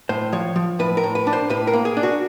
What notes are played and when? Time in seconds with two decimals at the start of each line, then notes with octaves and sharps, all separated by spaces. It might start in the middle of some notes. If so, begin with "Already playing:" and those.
0.09 A2 C5
0.32 F3 C#5
0.56 F3
0.79 A2 B4
0.97 A#4
1.04 A2
1.15 B4
1.27 D4
1.33 C5
1.50 A2 B4
1.67 A#4
1.73 A#3
1.85 G#4
1.97 D4
2.03 F#4